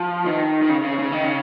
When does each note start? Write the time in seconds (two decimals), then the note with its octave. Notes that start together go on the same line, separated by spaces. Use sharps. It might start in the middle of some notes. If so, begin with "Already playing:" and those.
Already playing: F3
0.25 D#3
0.62 D#3
0.69 C#3
0.84 C#3
0.99 C#3
1.12 D#3
1.24 C#3